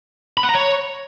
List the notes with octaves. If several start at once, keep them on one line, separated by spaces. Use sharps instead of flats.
B5
F#5
A#5
C#5